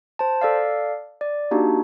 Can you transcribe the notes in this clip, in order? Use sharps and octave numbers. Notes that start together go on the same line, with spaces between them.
C5 A5
A4 D5 F5
D5
A#3 D4 D#4 F#4 G4